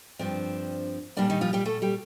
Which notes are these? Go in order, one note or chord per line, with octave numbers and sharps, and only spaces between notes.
G2 F3 C4 D4
A#2 G3 A#3 D4
D#3 D#4
F3 F4
G3 G4
A3 A4
G3 G4